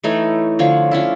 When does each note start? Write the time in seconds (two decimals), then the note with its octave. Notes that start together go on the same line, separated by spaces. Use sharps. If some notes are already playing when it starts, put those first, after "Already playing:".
0.04 E3 A3 D#4 C#5
0.59 D3 F3 C#5 C#6
0.91 F3 C#4 D4 E4